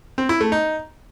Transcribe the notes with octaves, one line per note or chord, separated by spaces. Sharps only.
C4
E4
A3
D#4